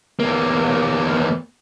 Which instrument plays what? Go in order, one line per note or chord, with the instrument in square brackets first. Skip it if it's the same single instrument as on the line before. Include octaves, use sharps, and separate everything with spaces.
[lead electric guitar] E2 A#3